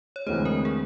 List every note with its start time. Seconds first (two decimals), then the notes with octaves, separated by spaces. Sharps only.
0.16 C#5
0.26 D2 C3 E3 G#3 C5
0.45 A#4
0.65 G#4